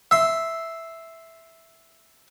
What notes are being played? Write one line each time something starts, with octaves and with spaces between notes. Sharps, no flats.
E5 C6